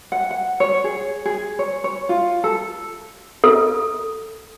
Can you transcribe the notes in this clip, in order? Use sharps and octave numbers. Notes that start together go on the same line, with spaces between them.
F#5
F#5
C#5
G#4
G#4
C#5
C#5
F4
A4
A4